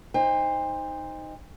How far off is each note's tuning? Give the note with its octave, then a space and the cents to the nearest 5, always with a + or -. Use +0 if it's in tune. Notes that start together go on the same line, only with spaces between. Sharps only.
D#4 +0 C5 +0 G5 +45